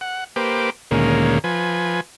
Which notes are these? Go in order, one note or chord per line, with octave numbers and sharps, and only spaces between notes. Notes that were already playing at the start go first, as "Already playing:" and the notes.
F#5
A#3 G4 B4 C5 D6
D2 A#2 D#3 G#3 A#3 C#4
F3 B4 G#5